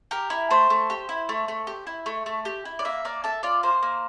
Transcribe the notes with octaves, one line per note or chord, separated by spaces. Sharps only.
G4 A#4
E4
A3 C5
A3
G4
E4
A3
A3
G4
E4
A3
A3
G4
E4
D5
A#3 E5
A#3 D5
A4 E5
F4 D5
A#3 C5
A#3